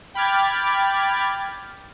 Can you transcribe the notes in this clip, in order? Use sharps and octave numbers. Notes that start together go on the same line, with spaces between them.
G5 B5 D6 F6 G#6 A6